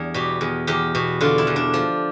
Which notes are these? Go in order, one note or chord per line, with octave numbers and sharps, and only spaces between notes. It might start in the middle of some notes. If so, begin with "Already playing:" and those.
Already playing: E2 G3 D4
B2 G4
E2
E2 G4
B2
D3 F4
E4
E2
D4
F3